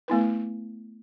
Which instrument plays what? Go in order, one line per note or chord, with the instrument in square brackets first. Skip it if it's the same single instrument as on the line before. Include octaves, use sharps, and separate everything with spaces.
[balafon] A3 B3 E4 B4